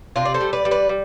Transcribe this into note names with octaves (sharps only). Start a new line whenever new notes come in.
C3 D4 F4
D5
A4 C5
G3
B4 D5
G3
B4 D5
G3